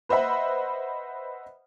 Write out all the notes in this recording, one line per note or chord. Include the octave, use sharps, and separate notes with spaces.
B4 C5 D#5 E5 F#5 B5